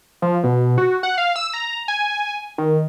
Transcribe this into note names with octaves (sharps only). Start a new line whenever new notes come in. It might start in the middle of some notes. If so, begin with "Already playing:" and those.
F3
B2
F#4
F#5
F5
E6
A#5
G#5
D#3